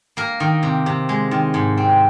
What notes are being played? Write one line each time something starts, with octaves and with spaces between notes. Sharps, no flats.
A#3 A#4
D#3
C3
C3
G#3
D#3
G#2
C4